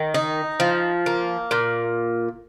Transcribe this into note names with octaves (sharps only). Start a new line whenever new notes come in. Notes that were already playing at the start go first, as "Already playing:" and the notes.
Already playing: D#3
D#4
F3
A#3
A#2